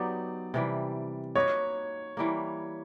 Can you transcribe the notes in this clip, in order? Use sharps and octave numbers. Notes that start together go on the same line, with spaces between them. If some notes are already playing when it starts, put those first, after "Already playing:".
Already playing: F#3 B3 D#4 G4 D5
C3 E3 G3
A#3 D#4 F#4 B4 C#5
E3 G3 A#3